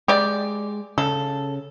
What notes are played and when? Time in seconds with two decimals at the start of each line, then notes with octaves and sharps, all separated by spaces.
0.08 G#3 G4 D5
0.98 C#3 A4